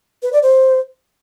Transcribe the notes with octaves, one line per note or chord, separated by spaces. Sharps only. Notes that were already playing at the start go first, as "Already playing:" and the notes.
B4
D5
C5